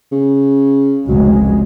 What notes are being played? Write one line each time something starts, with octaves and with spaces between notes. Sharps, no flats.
C#3
F1 C#2 F#3 G#3